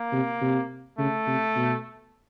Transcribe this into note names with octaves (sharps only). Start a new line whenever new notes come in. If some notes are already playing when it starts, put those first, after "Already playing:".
Already playing: A#3
C3
C3
C#3 A3
C3
B2